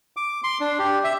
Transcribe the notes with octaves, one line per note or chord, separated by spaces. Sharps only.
D6
C6
D4
G4
E5